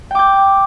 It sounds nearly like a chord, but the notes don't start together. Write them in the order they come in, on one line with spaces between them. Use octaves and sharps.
G5 D6 G6